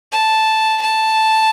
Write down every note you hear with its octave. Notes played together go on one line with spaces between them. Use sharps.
A5
A5